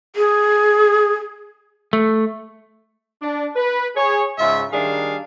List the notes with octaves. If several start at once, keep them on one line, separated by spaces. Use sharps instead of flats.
G#4
A3
D4
B4
G#4 C#5
G#2 C#3 F4 E5
D#3 G3 D4 G#4 F5